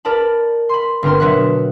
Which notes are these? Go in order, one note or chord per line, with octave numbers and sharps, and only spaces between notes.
A#4 D5 A5 B5
B5 C6
G1 C4 A#4 C6
B2 F#3 E5 F#5 F#6